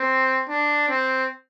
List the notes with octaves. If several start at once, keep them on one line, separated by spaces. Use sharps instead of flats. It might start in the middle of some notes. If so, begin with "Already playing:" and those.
Already playing: C4
D4
C4